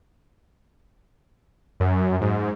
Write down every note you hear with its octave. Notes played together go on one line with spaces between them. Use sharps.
F#2
G#2